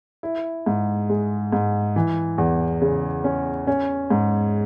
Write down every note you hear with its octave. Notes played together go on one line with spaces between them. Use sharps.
E4
G#2
G#3
G#2
E3
E2
C#3
C#4
C#4
G#2